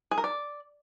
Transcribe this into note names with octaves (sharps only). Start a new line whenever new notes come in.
G#4
A#4
D5